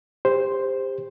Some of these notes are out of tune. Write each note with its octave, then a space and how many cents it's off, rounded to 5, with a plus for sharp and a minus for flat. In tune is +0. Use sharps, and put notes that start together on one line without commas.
G4 +30 C5 +0